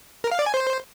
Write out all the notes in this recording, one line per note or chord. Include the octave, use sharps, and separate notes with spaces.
A#4
F5
D5
G#5
C5